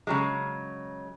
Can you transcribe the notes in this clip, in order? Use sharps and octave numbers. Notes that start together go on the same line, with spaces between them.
C#3 F#3 G#3